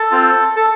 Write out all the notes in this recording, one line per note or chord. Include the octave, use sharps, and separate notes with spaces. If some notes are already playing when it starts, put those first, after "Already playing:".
Already playing: A4
C4 F4
A4